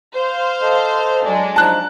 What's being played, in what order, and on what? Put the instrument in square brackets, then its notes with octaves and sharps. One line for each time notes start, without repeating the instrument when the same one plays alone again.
[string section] C5 F5
[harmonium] A4 D#5
[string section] F#3 G#3 D4
[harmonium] F3 D#4 [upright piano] A5 F#6